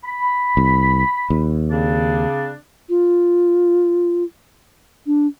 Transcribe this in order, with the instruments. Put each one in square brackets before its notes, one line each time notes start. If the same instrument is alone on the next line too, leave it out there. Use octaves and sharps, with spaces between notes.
[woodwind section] B5
[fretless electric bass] C2
D#2
[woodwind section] C#3 C4 D4
[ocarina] F4
D4